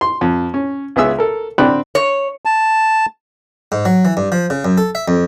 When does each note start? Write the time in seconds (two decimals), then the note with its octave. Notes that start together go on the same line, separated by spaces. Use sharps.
0.01 C6
0.21 F2
0.54 C#4
0.96 C#2 B3 G#4 E5 E6
1.18 A4 A#4
1.58 D3 C4 D5 G5 B5 F#6
1.95 C#5
2.45 A5
3.72 G#2
3.85 F#3
4.05 E3
4.17 G2
4.32 F3
4.50 C#3
4.65 F#2
4.78 A4
4.95 E5
5.08 F2